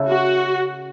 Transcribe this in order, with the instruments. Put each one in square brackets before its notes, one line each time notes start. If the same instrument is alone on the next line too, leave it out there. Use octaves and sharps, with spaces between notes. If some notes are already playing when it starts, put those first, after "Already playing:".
Already playing: [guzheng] C#3 A3 E4 A4
[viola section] F#4